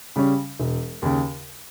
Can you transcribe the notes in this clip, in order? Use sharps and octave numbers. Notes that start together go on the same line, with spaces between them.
C#3 G3 C#4
E1
D#2 C#3